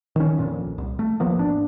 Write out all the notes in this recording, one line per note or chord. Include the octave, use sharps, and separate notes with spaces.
D#3 C#4
A#1 F2 A#2
C2
A3
D#1 F3 A#3 B3
G#1 D4